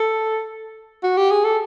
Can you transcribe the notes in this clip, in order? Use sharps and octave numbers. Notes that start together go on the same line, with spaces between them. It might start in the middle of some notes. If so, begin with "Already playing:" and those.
Already playing: A4
F#4
G4
G#4
A4